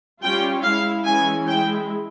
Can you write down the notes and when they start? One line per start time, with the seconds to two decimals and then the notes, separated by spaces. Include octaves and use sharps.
0.23 G3 C#4 F4 G5
0.64 G#3 E4 F5
1.05 E3 G#3 C#4 E4 G#5
1.47 G#3 E4 G5